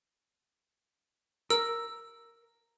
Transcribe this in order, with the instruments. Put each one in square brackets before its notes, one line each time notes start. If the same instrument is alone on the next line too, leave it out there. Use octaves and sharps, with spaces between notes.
[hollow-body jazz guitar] A#4 [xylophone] E6